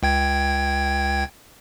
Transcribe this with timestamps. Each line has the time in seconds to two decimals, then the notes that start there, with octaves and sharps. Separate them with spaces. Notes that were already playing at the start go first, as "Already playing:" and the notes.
0.03 C#2 G5 G#6